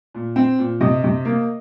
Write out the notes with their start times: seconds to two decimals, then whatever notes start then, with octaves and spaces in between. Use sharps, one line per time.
0.14 A#2
0.36 C4
0.59 A#2
0.81 C3 D#5
1.04 C3
1.25 A#3